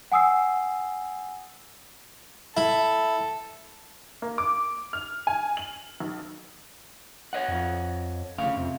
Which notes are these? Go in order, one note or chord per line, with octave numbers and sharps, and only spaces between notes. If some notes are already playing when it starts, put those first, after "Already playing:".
F#5 G#5 D#6 E6 C7
E4 A4
A#3
D6
F6
G#5
F#7
B1
C#5 D#5 F#5
F2
F1 D2 C#3 F5
F2 C3